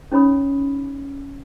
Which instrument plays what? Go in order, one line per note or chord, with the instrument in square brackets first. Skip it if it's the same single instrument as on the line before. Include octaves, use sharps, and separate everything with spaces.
[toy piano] C#4 D#4 C#5 B5 D#6